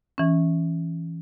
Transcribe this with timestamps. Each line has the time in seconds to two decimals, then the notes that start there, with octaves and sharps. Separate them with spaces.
0.18 E3 C#4